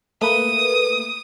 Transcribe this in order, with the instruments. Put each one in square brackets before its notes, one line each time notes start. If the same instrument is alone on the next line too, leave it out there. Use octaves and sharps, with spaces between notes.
[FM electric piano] A3 A#3 B4 [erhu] D#6